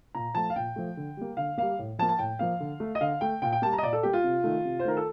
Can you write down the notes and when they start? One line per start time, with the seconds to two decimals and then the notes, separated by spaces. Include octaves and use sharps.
0.15 A#2 A#5
0.35 F3 A3 A5
0.50 F5
0.56 A#2 G5
0.76 F3 A3
0.97 D3
1.17 G3 A#3
1.37 D3 F5
1.57 G3 A#3 F5
1.79 A2
1.99 F3 A5
2.02 A#3
2.09 A5
2.19 A2 G5
2.39 F3 A#3 F5
2.60 D3
2.80 A3
2.95 D#5
3.01 D3 F5
3.21 A3 G5
3.42 A#2 G5
3.52 G5
3.62 G3 A#3 A5
3.73 A#5
3.78 D#5
3.83 A#2 D5
3.93 A4
4.03 G3 A#3 G4
4.13 F4
4.24 C3
4.44 D#3 A3
4.65 C3
4.79 C5
4.85 D#3 A3 A#4
4.97 A4